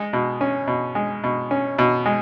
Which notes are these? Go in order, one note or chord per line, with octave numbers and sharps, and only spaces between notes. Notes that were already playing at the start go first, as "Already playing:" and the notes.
Already playing: G#3
B2
C#4
B2
G#3
B2
C#4
B2
G#3